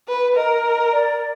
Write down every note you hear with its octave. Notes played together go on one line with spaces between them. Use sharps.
B4
A#4 D#5
D5